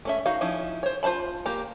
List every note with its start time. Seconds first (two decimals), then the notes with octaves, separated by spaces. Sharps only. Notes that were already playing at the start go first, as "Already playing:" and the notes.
0.05 A3 C#4 E5
0.26 D#4 F#4 F5
0.41 F3 C#4 D#4 E4
0.83 C5 C#5
1.03 F4 C5 F5 A5 B5
1.46 A#3 G4 A#5